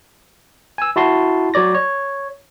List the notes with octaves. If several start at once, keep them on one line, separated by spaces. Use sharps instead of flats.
G#5 E6
E4 F#4 A5 C6
F#3 C#5 D5 A#6
C#5